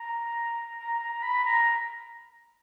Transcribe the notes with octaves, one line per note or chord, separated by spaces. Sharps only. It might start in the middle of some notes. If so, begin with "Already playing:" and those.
Already playing: A#5
A#5
A#5
B5
A#5